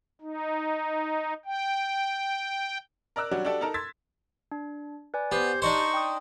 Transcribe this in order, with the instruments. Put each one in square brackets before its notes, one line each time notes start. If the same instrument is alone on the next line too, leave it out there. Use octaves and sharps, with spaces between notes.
[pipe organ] D#4
G5
[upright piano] A#4 D5 A#5 E6 F#6
F#3 G3 C#4 D4 F#4
D4 F#4 G4 A4 D5 A5
D#4 A4 A#4 A5 A#5
C6 E6 G#6 A6 B6
[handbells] D4
B4 D5 G#5
[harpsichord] B3 [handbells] G4 [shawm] C5
[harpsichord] D4 D#4 C5 [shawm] C#6
[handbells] G5 D#6